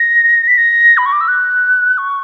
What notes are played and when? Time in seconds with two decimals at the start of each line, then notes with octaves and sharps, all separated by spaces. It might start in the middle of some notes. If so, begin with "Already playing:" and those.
Already playing: A#6
0.48 B6
0.58 A#6
0.98 B5
1.06 C#6
1.12 D6
1.21 E6
1.28 F#6
1.98 C#6